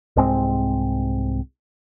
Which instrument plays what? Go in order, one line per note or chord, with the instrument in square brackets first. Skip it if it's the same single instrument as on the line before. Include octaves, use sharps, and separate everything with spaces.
[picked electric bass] C2 G#2 G#3 C4